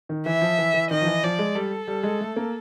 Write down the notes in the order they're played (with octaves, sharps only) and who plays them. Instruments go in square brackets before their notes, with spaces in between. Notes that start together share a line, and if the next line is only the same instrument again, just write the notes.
[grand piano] D#3
[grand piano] E3 [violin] E5
[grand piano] F3
E3
E3
[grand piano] D#3 [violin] D#5
[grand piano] F3
E3
[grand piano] F3 [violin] D5
[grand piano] G#3
[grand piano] G3 [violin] A4
[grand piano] G3
G#3
A3
A#3